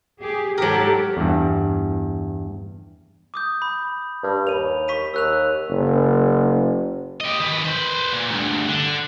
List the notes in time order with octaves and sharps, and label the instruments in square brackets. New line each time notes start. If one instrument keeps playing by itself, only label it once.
[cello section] G4 G#4
[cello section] G#2 G4 A4 [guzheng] F#3 A#4
[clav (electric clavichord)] E2 G2
[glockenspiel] D6 D#6 G6
B5
[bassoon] G2
[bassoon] D#2 [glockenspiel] B5 D#7 F7
[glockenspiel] C#6 B6 D#7
[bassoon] D#2 [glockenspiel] E6 F#6 F7
[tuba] F#1
[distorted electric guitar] G4 D#5
D#3 B4
B4 C5
A#2
D2 G2
D3